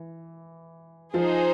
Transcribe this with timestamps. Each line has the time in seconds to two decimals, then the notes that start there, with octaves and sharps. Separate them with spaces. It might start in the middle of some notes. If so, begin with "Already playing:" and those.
Already playing: E3
1.14 F3 D#4 F4 G#4 C5